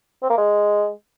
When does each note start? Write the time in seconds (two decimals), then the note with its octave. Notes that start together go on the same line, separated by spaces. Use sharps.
0.22 C4
0.30 A#3
0.38 G#3